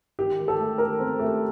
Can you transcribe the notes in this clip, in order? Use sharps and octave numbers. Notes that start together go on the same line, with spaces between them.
D#3 G4
D#3
A4
A3
D#3 A#4
C4
A3